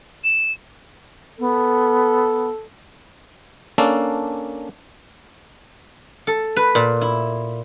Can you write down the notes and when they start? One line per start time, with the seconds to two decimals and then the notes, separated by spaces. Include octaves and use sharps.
0.24 E7
1.39 B3 A4
3.78 A#3 C#4 D4 A4
6.27 A4
6.56 B4
6.75 A#2
7.01 E4